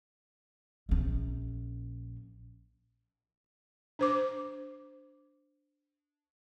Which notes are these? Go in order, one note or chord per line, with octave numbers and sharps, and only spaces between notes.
A#1 C#4
D4 C5 D6